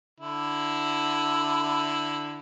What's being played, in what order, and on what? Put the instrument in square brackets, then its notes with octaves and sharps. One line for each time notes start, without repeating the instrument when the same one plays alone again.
[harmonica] D3 E4